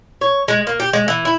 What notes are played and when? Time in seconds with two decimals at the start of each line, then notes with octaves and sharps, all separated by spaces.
0.21 C#5
0.48 G#3
0.67 A#3
0.80 G4
0.93 G#3
1.08 E3
1.25 E4